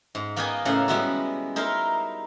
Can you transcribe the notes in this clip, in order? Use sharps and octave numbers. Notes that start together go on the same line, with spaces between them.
G#2
A#3 B3 D#4 D#5 G5 G#5
A2 C#3 A4 F5 F#5
G3 G#3 B3 C#4 E4 F#4
D#4 E4 A#4 C5